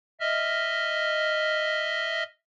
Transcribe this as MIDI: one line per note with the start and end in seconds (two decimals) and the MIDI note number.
0.20 2.23 75
0.20 2.23 76
0.20 2.23 89